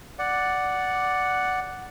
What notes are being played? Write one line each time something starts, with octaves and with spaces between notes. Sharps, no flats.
D5 F#5